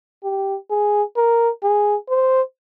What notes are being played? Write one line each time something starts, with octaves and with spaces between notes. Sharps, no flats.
G4
G#4
A#4
G#4
C5